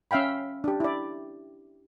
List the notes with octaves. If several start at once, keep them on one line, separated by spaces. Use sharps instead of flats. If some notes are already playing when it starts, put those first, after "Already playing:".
C#4 E5 F5 G5 B5
D4 G4
E4 D5